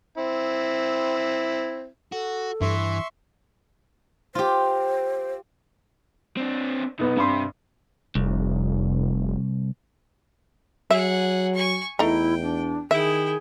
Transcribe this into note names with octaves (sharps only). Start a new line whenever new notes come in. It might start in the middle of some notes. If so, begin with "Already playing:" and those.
C4 E4
F#4 A4
G2 E3 E5 C6 C#6
F4 G4 C5
C4 D4
B1 B3 D#4
G2 C3 B5 C6
F1 C2
F#3 G#4 E5 F#5
G#5 C#6
E2 A3 D#4 E4 G5 A#5
D4
D#3 E4 G#4 E5 G5